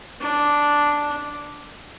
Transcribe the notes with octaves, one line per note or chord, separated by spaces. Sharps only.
D4